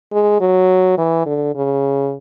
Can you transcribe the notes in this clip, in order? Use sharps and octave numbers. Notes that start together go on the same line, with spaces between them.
G#3
F#3
E3
D3
C#3